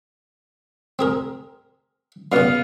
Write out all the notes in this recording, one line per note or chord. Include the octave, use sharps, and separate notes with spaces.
C4 G#4 A#4
F#2 C#3 B3 F5